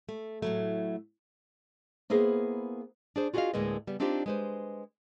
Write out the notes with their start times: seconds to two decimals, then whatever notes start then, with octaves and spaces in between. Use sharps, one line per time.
0.09 A3
0.42 A2 F#3 A3
2.10 A#3 B3 E4 G#4 A#4 C5
3.16 D4 G#4 C5
3.34 F4 F#4 G#4 C#5 D#5 F5
3.54 D2 A2 G#3 A#3 B4 D#5
3.87 C#3 G3 B3
4.00 C4 D4 D#4 F4 G4 C5
4.26 G#3 B4 C5